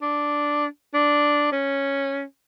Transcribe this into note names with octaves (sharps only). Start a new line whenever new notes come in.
D4
D4
C#4